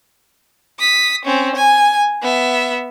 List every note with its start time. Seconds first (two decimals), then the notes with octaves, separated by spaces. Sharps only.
0.79 D#6 B6
1.25 C4 C#4
1.55 G#5
2.23 B3 E5